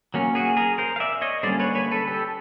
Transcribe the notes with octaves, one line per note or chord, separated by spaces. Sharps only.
F#3 A#3 C#4
F#4 G#4
G#4 A#4
A#4 C5
F5
D5 E5
C#5 D#5
D3 G3 A#3 C#4 C5 D5
B4 C#5
B4 C#5
A4 B4
G4 A4